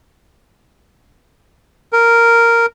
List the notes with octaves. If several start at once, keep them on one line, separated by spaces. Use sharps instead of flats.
A#4